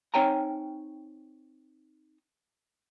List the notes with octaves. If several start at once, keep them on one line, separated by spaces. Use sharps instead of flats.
C4 D#4 C#5 G5 G#5 A#5